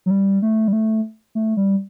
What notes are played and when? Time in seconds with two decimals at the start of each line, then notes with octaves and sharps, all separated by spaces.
0.06 F#3
0.10 G3
0.42 A3
0.68 G3
0.73 A3
1.35 A3
1.57 G3